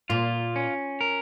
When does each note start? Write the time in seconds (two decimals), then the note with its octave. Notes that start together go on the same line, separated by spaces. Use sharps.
0.10 A#2 F4
0.56 C#4
1.01 A#4